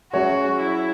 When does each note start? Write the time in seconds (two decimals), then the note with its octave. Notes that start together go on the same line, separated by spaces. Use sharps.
0.12 F#3 C#4 F#4 G#4 C#5 E5
0.59 E4